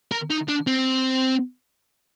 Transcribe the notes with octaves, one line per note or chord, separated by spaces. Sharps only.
A#4
D#4
D4
C4